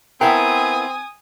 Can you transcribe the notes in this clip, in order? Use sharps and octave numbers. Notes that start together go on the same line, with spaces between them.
B3 C4 E4 A#4 G5 G#5 D#6